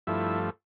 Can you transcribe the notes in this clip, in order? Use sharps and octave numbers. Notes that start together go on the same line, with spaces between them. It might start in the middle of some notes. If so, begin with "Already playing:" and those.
G2 F3 A3 E4